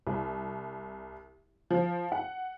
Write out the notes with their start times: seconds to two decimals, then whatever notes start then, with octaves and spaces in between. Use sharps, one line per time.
0.07 C2
1.70 F3
2.12 F#5